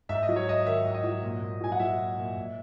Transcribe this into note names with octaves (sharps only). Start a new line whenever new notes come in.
G#2 E5
D#5
F#3
C#5
G#2 D#5
D#3 E5
G#2
D#5
F#3
A#2
A#2
F#3 G#5
F#5
F#3 E5
A#2
A#2
G#2